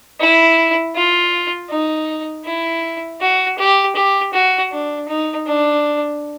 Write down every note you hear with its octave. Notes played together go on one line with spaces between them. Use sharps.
E4
F4
D#4
E4
F#4
G4
G4
F#4
D4
D#4
D4